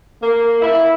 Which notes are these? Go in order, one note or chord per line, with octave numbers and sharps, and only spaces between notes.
A#3
E4